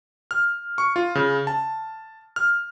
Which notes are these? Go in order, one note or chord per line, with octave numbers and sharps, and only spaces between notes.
F6
C#6
F4
C#3
A5
F6